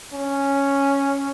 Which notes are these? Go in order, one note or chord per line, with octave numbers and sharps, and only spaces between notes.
C#4